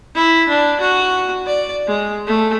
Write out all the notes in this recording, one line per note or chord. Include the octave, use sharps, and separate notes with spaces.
E4
D4
F#4
D5
G#3
A3